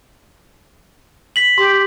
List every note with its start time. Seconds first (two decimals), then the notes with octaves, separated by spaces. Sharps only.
1.36 B6 F#7
1.58 G4 C6